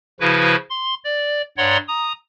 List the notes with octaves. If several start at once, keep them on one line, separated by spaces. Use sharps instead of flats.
C#3 F3 E4 F#4 B4
C6
D5
G2 C#5 D5 F#5 A#5 C6
A#5 D#6